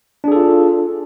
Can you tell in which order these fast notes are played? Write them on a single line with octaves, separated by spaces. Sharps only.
D4 G#4 A4 F4